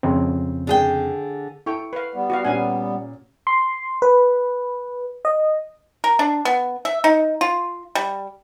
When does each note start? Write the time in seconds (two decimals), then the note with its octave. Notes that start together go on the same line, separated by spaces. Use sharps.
0.03 F2 C#3 C4
0.67 D3 G#4 G5
1.66 E4 A4 G5 C#6
1.93 B4 F5
2.14 G3 B3
2.30 F#4 G4 F5
2.45 A#2 C#4 G4 F5 F#5 G#5
3.47 C6
4.02 B4
5.25 D#5
6.04 A#4
6.19 D4
6.45 B3
6.85 E5
7.04 D#4
7.41 F4
7.95 G3